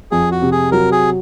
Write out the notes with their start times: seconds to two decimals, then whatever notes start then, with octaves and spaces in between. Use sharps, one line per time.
0.11 F2 G#4
0.31 F#4
0.42 C3
0.52 G#4
0.72 F#3 A#4
0.92 G#4